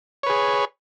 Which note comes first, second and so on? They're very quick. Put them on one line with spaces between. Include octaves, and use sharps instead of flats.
C#5 B4 G#4